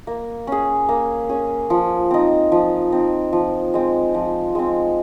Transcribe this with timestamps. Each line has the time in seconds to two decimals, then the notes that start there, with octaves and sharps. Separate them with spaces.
0.07 A#3
0.47 C#4 G#4
0.89 A#3
1.29 C#4 G#4
1.70 F3
2.11 C4 D#4
2.52 F3
2.92 C4 D#4
3.33 F3
3.74 G#3 C4
4.14 F3
4.55 G#3 C4